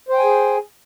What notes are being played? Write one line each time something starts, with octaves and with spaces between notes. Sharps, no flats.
G#4 C5 G5 G#5